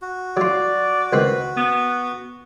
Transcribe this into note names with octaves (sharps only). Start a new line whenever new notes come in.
F#4
F#3 F4 D5
C#2 D#3 C4 B4
B3